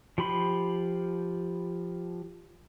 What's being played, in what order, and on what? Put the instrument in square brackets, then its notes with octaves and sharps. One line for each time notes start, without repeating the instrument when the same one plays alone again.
[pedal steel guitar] F3 G4 B5 C6